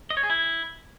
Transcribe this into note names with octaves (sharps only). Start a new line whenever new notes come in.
D#5
C#5
G#4
E4